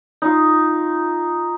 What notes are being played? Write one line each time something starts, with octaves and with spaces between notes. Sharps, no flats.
D#4 F4